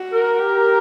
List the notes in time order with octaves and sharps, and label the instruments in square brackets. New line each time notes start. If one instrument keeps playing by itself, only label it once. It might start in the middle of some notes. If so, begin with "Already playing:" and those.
Already playing: [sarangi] F#4
[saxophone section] A#4
[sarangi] G4